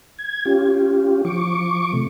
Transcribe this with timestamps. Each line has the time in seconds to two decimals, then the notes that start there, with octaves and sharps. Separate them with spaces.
0.18 G#6
0.45 C#4 F4 G4
1.25 F3 C#6 D6
1.93 C3 A3